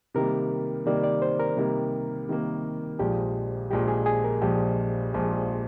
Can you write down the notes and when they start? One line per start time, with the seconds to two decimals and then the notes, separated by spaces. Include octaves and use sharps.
0.14 C3 D#3 G3 A#3 A#4
0.86 C3 D#3 G3 A#3 D5
1.03 D5
1.22 C5
1.39 A#4
1.57 C3 D#3 G3 A#3
2.29 C3 D#3 G3 A#3
2.99 A#1 A#2 F3 G#3 G4
3.71 A#1 A#2 F3 G#3 G4
3.88 G#4
4.06 G#4
4.24 A#4
4.41 A#1 A#2 F3 G#3 G4
5.13 A#1 A#2 F3 G#3